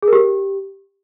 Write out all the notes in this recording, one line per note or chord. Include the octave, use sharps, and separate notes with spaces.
G#4
A#4
G4